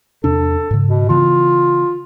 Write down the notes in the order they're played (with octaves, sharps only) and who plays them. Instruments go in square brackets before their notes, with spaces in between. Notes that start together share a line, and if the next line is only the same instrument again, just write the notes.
[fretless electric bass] E2 C3 D4 [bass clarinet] A4
[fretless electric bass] G#2 C#3
[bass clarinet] B2
[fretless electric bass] C#3 E3 B3 [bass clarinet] F4